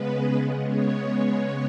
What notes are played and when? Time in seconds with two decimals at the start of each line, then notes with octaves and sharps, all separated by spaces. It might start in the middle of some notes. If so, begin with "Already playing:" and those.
Already playing: C#3 G#3 B3 B4
0.66 C#5